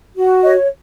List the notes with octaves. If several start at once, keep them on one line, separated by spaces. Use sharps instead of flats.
F#4
C#5 D#5